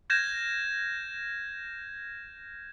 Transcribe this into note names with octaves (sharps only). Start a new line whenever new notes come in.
F6 G6 G#6 A#6 E7